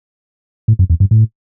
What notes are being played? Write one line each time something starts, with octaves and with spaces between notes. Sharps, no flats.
A2
F#2
E2
G2
A2